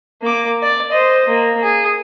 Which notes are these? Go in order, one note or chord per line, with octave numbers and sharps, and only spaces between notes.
A#3 D6
D5
C5 D#5
A#3
G#4